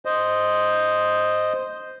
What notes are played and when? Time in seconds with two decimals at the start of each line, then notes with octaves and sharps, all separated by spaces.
0.05 C5 D#5